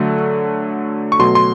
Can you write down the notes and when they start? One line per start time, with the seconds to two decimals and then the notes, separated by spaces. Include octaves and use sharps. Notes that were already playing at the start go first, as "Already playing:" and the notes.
Already playing: D3 F#3 A3
1.12 C#6
1.19 B2 F#3 A3 C6
1.35 C6